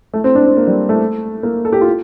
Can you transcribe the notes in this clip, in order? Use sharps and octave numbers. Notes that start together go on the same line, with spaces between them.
A3
C4
D4
C4
A#3
G3
A3
A#3
A4
G4
F4